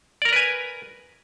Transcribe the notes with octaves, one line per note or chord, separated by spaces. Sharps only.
A#4 B4 D5 G#5 A#5